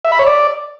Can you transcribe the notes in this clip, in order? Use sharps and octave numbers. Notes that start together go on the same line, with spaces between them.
E5
B5
C#5
D5